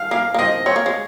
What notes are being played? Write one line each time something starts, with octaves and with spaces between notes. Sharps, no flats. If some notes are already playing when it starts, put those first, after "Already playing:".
Already playing: F5
A#3 F5
A#3
C4 D#5
C4 C#5
A#3
G#3